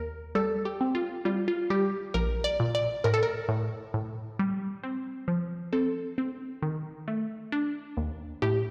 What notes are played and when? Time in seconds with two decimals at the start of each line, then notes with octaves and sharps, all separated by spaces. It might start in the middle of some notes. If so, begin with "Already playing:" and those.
Already playing: D#2 A#4
0.35 G3 A4
0.65 G4
0.81 C4
0.95 F4
1.25 G3 F4
1.48 F4
1.70 G3 G4
2.14 A#1 A#4
2.44 D5
2.60 A#2
2.75 D5
3.04 A2 A#4
3.14 A4
3.23 A#4
3.49 A2
3.94 A2
4.39 G3
4.83 C4
5.28 F3
5.73 C4 A4
6.18 C4
6.62 D#3
7.08 A3
7.52 D4
7.97 D#2
8.42 A2 G4